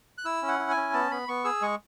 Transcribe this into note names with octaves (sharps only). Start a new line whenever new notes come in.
F#6
E4 E6
C#4
F#5
E4
G#5
C#4
B3 A5
B3 B5
B3 C#6
G#4 E6
G#3 C#6